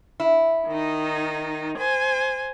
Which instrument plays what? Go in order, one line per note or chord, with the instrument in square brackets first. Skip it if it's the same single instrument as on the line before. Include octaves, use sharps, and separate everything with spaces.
[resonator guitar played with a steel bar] E4
[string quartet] D#3 D#4
C5 G#5